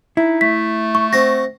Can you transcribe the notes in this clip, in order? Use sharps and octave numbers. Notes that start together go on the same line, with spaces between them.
D#4 E4
A3 B6
C#6
C4 F#4 A#6